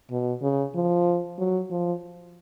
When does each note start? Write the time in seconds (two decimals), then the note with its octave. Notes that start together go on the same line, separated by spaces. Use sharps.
0.11 B2
0.42 C#3
0.75 F3
1.38 F#3
1.71 F3